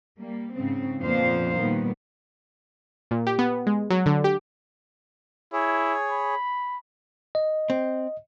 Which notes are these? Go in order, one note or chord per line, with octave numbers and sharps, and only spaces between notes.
G3 A#3
G#2 C#3 C4
F2 A#2 B3 D4 C5 F5
A#2 D#3 G3 B3
A#2
G4
B3
G#3
F#3
D3
G4
E4 G#4 C#5
B5
D#5
C4